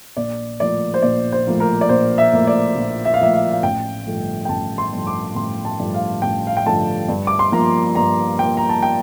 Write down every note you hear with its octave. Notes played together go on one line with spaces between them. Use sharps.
A#1 D5
A2 F3 A#3 D5
C5
A#1 D5
C5
A2 F3 A#3
A#4
D5
A#1 C5
E5
A2 F3 A#3
D5
A#1
E5
F5
A2 F3 A#3 E5
F5
F5
A1 G5
G2 D3 F3 A3
G5
A1 A5
C6
G2 D3 F3 A3
D6
A1 C6
A5
G2 D3 F3 A3
F5
A1 G5
F5
G5
G2 D3 F3 A3 A5
G2
D6
C6
F3 A#3 A#5
G2 A#5
F3 A#3 G5
A#5
A5
G5